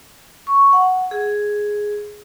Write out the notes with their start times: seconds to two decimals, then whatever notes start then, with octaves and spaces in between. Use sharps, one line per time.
0.47 C#6
0.73 F#5
1.11 G#4